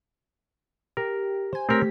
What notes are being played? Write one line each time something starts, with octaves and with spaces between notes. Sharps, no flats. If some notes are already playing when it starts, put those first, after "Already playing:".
G4 A#4
C5 G#5
A3 C4 G4 A#4 C#5 B6